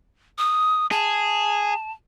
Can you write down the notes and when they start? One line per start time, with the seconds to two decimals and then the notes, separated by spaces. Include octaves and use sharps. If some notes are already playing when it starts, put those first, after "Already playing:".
0.38 D#6
0.91 G#4 A5